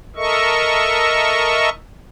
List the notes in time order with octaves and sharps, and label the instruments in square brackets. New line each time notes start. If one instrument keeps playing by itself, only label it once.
[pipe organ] A4 A#4 D#5 E5 C#6